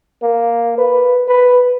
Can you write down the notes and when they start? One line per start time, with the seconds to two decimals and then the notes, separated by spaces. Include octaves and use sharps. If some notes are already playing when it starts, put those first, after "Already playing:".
0.22 A#3
0.78 B4
1.28 B4